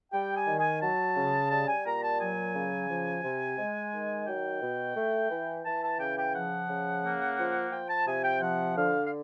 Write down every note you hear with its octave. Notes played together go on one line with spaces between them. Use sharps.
G3 G5
G#5
D#3
G#5
F#3 A5
C#3
G3 A5
G#5
A#2 A#5
A5
F#3 G#5
C#3
F3
C3
G#3
D#3
F#3 G5
B2
A3
E3
E3 A5
A5
C#3 G5
G5
F3 F#5
C#3
A#3
F3
F3 G5
A5
C3 G#5
G5
F3 F#5
D3 F5
F5